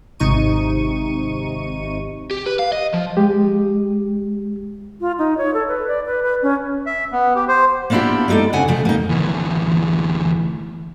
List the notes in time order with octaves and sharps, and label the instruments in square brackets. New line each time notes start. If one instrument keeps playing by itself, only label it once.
[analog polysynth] G#1 C3 D#4 C#6 D#7
[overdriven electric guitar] G4
B4
F5
D#5
F3
[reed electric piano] G#3 G4
[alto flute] F4
D#4
C#5
A4
B4
D5
B4
B4
C#4
[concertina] E5
B3
G4
C5
[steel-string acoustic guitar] A#3 B3 D4 E4 F4 G4
G#3 A#3 D#4 A4 D5
F2 C#3 F#5 G#5
F2 C3 A3
A#3 D#4
[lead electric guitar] D2 E3